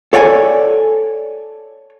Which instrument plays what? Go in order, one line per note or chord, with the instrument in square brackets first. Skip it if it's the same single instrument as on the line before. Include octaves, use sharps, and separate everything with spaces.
[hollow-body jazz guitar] A4 C#5 D5 F#5 G#5